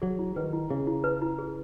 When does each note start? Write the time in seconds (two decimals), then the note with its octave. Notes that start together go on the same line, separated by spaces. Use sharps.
0.02 F#3 G#4
0.19 E4
0.36 D#3 B4
0.53 E4
0.70 C#3 G#4
0.87 E4
1.04 B4
1.22 E4
1.39 G#4